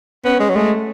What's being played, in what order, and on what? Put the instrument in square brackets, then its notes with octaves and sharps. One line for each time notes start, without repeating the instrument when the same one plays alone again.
[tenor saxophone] B3 [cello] C#4
[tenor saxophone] G#3
F#3
[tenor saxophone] G#3 [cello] A3